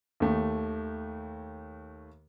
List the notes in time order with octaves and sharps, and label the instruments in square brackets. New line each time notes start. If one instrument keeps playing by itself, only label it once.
[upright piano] D#2 A3